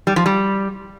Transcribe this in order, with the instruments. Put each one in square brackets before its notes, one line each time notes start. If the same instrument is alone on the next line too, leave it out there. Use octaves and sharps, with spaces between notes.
[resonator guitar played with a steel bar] G3
F3
G3